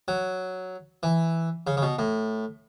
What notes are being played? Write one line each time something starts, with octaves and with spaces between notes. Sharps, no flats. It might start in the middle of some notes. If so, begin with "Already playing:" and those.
F#3
E3
C#3
C#3
B2
A2